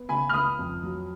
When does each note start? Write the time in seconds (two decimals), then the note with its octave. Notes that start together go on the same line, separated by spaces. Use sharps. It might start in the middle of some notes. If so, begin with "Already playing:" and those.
Already playing: B3
0.09 C#3 G#5 B5
0.29 F6
0.33 C#2 B5 D#6
0.59 F2
0.83 F#3